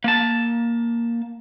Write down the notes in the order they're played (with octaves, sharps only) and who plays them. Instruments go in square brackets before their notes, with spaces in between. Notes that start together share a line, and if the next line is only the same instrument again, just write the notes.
[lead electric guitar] A#3 A5